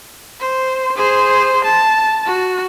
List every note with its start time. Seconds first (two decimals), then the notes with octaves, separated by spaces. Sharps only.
0.40 C5
0.96 G#4 C5
1.65 A5
2.26 F#4